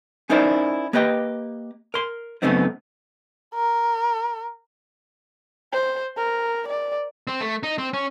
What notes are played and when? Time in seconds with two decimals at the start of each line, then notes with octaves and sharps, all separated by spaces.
0.30 C#4 D#4 E4 A#4 C5 D5
0.93 A#3 G4 B4 D#5 G5
1.94 A#4 C6
2.42 F#2 C#3 A3 B3 C4 D#4
3.55 A#4
5.72 C5
6.17 A#4
6.67 D5
7.27 C4
7.40 A3
7.63 D#4
7.78 C4
7.93 C#4